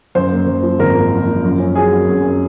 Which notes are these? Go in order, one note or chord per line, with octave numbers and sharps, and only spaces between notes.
F#2 C5
A#3
F#2
F3
G#1 A#4
A#3
F3
F3
F#2
C#4
F#3 G#4
F#3
F#2